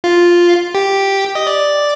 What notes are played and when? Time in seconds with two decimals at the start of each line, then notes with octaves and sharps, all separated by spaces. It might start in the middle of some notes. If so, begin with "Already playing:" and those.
0.04 F4
0.75 G4
1.35 D#5
1.47 D5